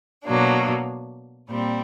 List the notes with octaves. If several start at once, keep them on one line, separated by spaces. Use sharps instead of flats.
B2 F#3 A#3 D4
A#2 G3 C4